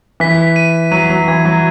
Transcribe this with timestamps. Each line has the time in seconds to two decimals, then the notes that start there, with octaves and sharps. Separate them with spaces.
0.20 E3 B6
0.56 D#7
0.91 F#3 D#7
1.10 F#3
1.28 E3 G#6
1.45 F#3